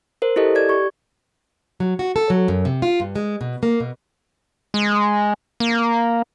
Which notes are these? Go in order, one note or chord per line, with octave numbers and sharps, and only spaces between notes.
A#4 C5
E4 G4 A4 D#5
D5 G#6
G4 C#6
F#3
F#4
A4
F#3
F#2
C3
F4
G2
G#3
B2
A#3
B2
G#3
A#3